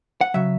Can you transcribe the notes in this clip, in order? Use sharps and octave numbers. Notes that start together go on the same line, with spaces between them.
F#5
C#3 F#3 E5